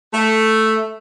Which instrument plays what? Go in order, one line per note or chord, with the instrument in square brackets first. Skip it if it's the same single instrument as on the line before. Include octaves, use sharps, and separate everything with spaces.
[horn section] A3